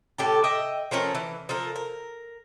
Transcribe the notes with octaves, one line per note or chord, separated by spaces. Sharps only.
A2 G4 A4
D#5 E5 G5
F3 A3 C#4 A#4
E3
F3 A4 A#4
A#4